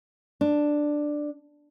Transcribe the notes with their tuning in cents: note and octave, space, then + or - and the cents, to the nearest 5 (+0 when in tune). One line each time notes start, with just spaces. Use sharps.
D4 +5